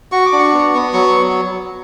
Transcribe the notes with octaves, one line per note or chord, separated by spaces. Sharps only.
F#4 C#6
D6
D4
C#6
B3
B3
F#3 C#6